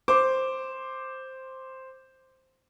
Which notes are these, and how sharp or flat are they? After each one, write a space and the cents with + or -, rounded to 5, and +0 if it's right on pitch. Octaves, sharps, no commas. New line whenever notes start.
C5 +0 D6 +0